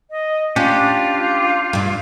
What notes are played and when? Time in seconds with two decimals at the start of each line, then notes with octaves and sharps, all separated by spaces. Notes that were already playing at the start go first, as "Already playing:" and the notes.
0.10 D#5
0.56 C#4 D4 F4 G4
1.73 G2 G3